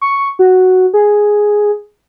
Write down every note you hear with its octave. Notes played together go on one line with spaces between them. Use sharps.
C#6
F#4
G#4